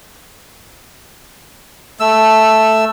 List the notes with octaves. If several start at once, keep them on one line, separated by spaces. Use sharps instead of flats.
A3 E6